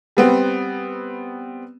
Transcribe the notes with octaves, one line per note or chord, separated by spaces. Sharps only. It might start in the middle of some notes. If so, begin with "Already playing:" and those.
G3 B3 C4